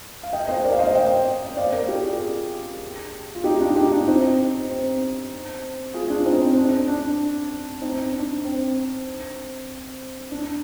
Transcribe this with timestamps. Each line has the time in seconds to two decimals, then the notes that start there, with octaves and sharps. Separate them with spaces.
0.23 F5
0.33 D#5 G5
0.48 C5 D#5
0.64 A#4 D5
0.73 F5
0.79 C5 D#5
0.95 D#5 G5
1.57 D5 F5
1.72 A#4 D5
1.88 G4 A#4
2.04 F4 G#4
3.35 F4
3.44 D#4 G4
3.60 D4 F4
3.76 D#4 G4
3.91 D4 F4
4.07 C4 D#4
4.70 C4
5.94 F4 G#4
6.10 D4 F4
6.25 C4 D#4
6.41 C4
6.57 D4
6.87 D4
7.81 C4 D#4
8.13 D4
8.44 C4
10.32 D4